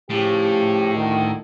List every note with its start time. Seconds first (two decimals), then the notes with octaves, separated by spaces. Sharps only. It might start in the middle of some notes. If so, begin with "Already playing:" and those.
0.10 A2 C#3 F3 G4
0.95 D2 D#3